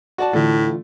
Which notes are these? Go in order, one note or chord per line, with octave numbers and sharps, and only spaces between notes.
F#4 D5 A5
A2 D3 E3 A3 F4